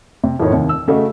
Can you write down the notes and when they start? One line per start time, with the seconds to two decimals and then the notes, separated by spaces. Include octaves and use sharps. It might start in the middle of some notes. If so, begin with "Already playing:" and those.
0.24 C3
0.40 F2 A2 D#3 C#5
0.52 D#2 C3
0.69 E6
0.88 C#3 A3 F#4 D#5